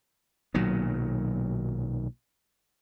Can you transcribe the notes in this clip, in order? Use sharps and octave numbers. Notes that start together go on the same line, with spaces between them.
B1 A#2 D#3 F#3